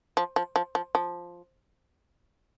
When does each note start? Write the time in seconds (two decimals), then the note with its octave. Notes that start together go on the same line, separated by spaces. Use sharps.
0.17 F3
0.36 F3
0.56 F3
0.75 F3
0.95 F3